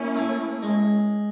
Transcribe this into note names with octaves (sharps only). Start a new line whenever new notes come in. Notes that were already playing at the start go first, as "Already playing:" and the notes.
Already playing: A#3 C#4 E4
A3
G#3